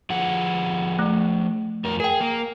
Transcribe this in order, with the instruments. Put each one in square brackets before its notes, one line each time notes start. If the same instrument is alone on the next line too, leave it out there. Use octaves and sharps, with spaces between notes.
[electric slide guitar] F3 G#4 F#5
[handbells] A3
[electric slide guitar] F2 A#4
[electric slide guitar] G#4 [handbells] A#4 G5
[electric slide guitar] A#3